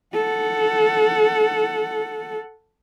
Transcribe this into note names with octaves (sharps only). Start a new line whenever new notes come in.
A4 F#5